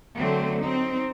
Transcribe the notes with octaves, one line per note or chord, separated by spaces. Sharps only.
D3 F#3 A3 C4
C4 D#4